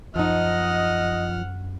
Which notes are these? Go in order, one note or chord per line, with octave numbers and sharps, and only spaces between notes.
F#2 F3 D#4 D#5 F#5 F6